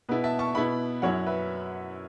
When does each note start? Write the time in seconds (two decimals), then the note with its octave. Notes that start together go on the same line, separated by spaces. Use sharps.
0.09 B2 B3 E4 B4
0.24 E5 A5
0.39 A5 C#6
0.55 B2 B3 E4 F#5 B5
1.02 F#2 F#3 C#4 E4 C#5 F#5
1.26 B4 E5